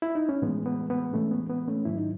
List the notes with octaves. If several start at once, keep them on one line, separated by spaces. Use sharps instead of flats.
E4
D#4
C#4
A2 E3 G#3 B3
B3
B3
A2 E3 G#3 A3 C#4
B3
B3
A3 C#4
G#2 D#3 F#3 E4
D#4